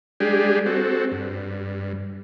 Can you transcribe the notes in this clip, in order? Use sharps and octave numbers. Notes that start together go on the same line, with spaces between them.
G3 G#3 D4 G4 G#4
C4 F#4 A4
G2